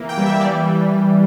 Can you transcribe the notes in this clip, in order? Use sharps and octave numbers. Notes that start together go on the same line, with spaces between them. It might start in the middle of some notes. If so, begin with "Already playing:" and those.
Already playing: E3 A#3
G5
G3
E5
E3 D5